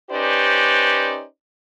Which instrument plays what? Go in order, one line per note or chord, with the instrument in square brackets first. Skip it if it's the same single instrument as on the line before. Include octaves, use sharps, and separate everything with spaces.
[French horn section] C#4 D#4 G4 B4 C5 D5